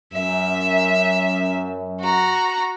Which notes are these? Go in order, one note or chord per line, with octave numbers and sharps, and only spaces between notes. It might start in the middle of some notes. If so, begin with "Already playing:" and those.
F#2 E5
F#4 A#5